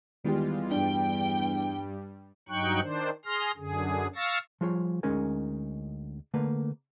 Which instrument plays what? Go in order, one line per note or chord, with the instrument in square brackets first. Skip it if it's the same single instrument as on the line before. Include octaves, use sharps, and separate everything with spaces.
[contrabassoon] E2 [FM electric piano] D#3 G4 [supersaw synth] G3 G#3 F4
[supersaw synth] G2 G3 [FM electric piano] D4 [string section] G5
[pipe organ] G2 F#3 D#4 G5 C#6 F#6
D#3 D4 C5
G#4 C6 F6 A#6
F#2 D3 G#4
F5 C#6 E6 A6 A#6
[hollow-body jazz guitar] F3 G3 F4 G#4 C#5
D2 G#3 C#4 D#4 A#4 G#5
D3 A3 A#3 B4